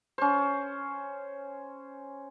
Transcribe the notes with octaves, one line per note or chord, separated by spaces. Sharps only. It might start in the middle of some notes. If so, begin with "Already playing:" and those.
C#4 C5